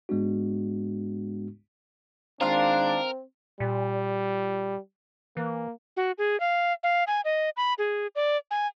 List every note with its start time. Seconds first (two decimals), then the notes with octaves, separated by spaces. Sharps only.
0.09 G#2 G#3 B3 D4 F#4
2.41 D#3 G#3 C4 D4 F4 A#4 F5
3.60 A#2 G3
5.37 E3 A#3
5.97 F#4
6.18 G#4
6.40 F5
6.83 F5
7.07 G#5
7.25 D#5
7.57 B5
7.78 G#4
8.15 D5
8.51 G#5